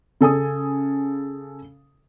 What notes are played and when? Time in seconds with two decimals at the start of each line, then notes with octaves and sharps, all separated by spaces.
0.21 C#3 A4 G#5 D#6